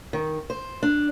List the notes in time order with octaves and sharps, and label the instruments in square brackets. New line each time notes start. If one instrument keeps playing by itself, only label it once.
[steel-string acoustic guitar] D#3
C5
D4